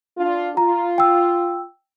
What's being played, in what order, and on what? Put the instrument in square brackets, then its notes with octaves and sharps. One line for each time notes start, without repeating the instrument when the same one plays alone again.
[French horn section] D4 F4
[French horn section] F4 [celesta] A#5
[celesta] G5 E6